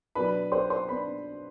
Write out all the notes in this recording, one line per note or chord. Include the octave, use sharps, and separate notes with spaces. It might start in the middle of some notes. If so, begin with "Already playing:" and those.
B2 F#3 B3 D4 B4 B5
C5 C6
C5 C6
B3 D4 B4 B5